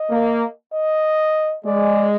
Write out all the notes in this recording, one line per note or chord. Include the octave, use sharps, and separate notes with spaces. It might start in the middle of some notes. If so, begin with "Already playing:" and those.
Already playing: D#5
A#3
D#5
G#3 D5